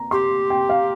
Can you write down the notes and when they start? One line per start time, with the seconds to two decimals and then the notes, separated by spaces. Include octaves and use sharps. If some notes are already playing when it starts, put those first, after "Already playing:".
Already playing: A#5
0.11 G4 C6
0.50 G5
0.69 F5